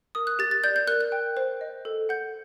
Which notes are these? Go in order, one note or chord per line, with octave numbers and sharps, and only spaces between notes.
A#4 D#6
F#6
G4 A6
A6
D5 G6
G6
A#4 F#6
F#6
G5
C5
D#5
A4
F#5 G6